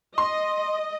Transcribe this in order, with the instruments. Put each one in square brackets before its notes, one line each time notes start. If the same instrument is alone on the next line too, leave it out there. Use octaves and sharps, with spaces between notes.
[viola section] D#5 [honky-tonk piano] C6